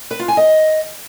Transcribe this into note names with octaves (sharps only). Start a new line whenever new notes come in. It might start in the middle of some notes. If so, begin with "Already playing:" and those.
B4
F4
G#5
D#5